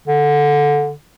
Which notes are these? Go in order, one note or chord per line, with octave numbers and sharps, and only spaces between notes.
D3